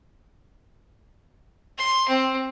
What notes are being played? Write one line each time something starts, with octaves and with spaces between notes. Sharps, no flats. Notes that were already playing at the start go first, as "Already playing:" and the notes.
C6
C4